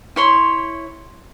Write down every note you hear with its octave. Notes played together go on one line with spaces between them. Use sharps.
E4 C#5 C6